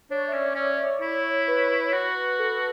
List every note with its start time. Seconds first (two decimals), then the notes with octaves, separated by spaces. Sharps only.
0.10 D4 C#5
0.28 E5
0.33 C#4 D5
0.55 C#4 D5
0.79 C#5
1.01 E4
1.47 B4
1.58 C#5
1.68 B4
1.93 F#4
2.39 A4